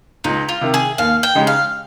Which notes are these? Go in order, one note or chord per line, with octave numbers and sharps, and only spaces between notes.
C#2 D#4
F4
C3 D#3
G#4
D#2 F5
G5
C#3 G#3 D#4 G4
F5